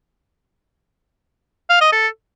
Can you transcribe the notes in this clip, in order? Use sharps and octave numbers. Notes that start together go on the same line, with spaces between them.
F5
D#5
A4